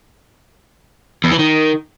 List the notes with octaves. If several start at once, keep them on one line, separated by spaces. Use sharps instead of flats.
E2
E3
D#3